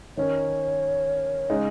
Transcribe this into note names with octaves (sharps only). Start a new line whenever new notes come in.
D#3 C#4 A#4 C#5
C#3 G#3 D#4